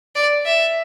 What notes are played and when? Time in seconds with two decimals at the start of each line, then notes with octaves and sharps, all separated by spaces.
0.15 D5
0.46 E5